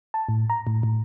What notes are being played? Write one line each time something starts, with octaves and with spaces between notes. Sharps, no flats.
A5
A2
A#5
A2
A2